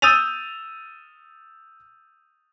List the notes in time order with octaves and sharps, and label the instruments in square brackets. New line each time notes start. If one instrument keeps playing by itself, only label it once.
[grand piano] D#6 E6 G6 A6 D#7 F7